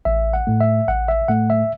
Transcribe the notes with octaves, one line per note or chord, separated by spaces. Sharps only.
A1 E5
F#5
A2 A3
E5
A1 F#5
E5
A2 A3 F#5
E5